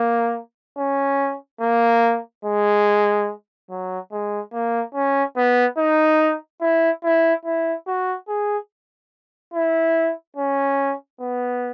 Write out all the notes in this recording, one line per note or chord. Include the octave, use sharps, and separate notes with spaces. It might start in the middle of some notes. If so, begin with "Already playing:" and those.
Already playing: A#3
C#4
A#3
G#3
F#3
G#3
A#3
C#4
B3
D#4
E4
E4
E4
F#4
G#4
E4
C#4
B3